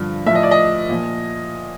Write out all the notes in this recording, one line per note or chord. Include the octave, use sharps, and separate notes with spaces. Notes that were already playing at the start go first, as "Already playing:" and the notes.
Already playing: G2 D3 F3
A2 F3 D#5 E5
D5
D#5
A#2 F3